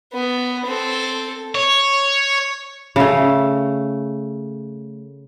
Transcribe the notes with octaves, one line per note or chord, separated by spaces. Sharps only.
B3
C4 A4
C#5
C#3 A3